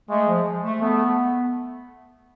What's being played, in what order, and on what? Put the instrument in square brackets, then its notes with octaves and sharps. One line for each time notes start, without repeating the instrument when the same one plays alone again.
[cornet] G#3 [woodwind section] A3
[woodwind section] F3
F3
A3
[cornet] A3 [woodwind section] B3